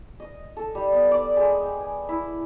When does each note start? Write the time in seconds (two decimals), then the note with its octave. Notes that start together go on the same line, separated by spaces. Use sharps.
0.20 D#5
0.57 A4
0.75 G3
0.92 B3
1.11 D5
1.36 G#3
1.63 G5
1.80 G#5
2.09 E4